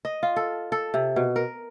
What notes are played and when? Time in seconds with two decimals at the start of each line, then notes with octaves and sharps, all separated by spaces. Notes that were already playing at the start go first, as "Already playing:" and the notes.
0.05 D#5
0.23 F4
0.36 A4
0.72 A4
0.94 C3
1.16 B2
1.36 A#4